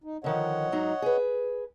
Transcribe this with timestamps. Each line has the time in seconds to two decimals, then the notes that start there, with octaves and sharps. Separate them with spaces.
0.04 D#4
0.24 D3 D#3 F3 C#5 D#5 F#5
0.72 G#2 F#3 D#4
1.02 G#4 B4